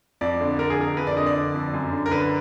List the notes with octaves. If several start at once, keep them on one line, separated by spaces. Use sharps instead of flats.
F2 D5
D3
D3 A#4
G#4
F2 A#4
F2 B4
D5
D3 D#5
D5
D3
F2
F#2
D3
A#4
D3 B4